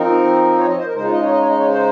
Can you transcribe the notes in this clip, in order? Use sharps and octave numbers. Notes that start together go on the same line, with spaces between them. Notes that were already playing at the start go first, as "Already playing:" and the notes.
Already playing: F3 C4 D#4 A#4
C#5
D#5
C5
A#4
C#3 G#3 D#4 C5
F4
D#5
C#5
D#5
C#5
D#5
C#5
C5